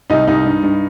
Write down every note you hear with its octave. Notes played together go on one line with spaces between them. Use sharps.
C2 D#4 D#5
C2 D#4 D#5
G2
G2